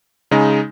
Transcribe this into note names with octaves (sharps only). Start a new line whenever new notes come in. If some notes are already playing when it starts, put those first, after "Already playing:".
C#3 G#3 D#4